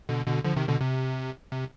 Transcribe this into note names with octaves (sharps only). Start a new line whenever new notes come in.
B2 D3
B2 D3
D3 F3
C3 D#3
B2 D3
C3
C3